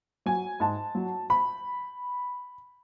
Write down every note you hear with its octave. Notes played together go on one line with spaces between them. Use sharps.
F#3 G#5
G#2 A5
F#3
B5